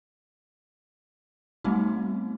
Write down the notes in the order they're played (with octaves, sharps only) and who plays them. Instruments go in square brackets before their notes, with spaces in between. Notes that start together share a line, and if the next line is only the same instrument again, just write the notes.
[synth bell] G3 A3 B3 C4 D#4 F#4